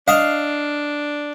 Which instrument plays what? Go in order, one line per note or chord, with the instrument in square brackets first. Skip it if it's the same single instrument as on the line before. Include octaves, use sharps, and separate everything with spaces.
[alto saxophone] D4 [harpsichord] D#5 F5